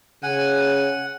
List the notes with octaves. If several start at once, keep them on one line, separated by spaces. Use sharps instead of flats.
C#3 F#5 G#5